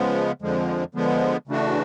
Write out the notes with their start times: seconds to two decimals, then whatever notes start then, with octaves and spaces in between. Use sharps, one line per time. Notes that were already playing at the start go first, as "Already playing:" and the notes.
Already playing: C#3 F3 G#3 B3
0.42 F2 D3 F3 G#3
0.95 D3 F3 G#3 B3
1.47 C#3 E3 A3 D4 F#4